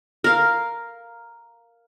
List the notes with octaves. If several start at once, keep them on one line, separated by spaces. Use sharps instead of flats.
A#4 F5